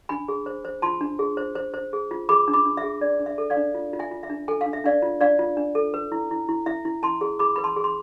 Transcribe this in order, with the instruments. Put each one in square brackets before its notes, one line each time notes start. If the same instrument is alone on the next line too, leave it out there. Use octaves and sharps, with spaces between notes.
[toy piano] D4 G#5 B5
G#4
C5
C5
F4 A5 C6
D4
G#4
C5
C5
C5
G#4
F4
G#4 B5 D6
D4
B5 D6
D4
E5
G#4
D4 D5
D4
E5
A4
D5 F5
D4
F4
F4
E5 G#5
F4
E5
D4
A4 G#5
F5
D4
E5
D4 D5 F5
F4
D4 D5 F5
F4
D4
A4
B4
E4
E4
E4
E4 E5
E4
E4 A5 C6
G#4
G#4 B5 D6
B4 B5
A5 C6
G#4
C6